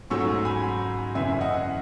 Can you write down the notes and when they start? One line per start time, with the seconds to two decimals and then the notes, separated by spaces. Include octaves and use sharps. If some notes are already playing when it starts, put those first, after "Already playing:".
0.10 G#2 F#3 A3 C#4 C#6 E6
0.45 G#5 B5
1.15 F#2 C#3 E3 E5 G#5
1.41 D#5 F#5